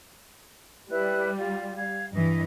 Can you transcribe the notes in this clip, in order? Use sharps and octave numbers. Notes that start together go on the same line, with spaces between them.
G3 E4 B4 F#6
F4
F5 G#6
G2 E3 D#5